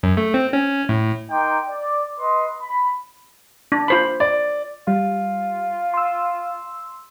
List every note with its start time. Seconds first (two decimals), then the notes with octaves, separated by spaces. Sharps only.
0.03 F#2
0.17 A3
0.34 C4
0.53 C#4
0.89 A2
1.31 D#4 A#4 G5 C6 D6
1.69 D5
2.19 B4 D#5 C6
2.62 B5
3.72 D4
3.88 F4 C5 B5
4.20 D5
4.88 G3 F4
5.94 C6 E6